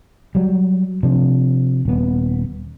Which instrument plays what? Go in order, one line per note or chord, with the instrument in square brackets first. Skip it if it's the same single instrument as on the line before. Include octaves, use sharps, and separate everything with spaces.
[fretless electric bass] F#3 G3
C3 F3 D4
D#1 B3